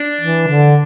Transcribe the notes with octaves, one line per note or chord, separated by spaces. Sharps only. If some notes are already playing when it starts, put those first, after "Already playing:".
Already playing: D4
E3
D3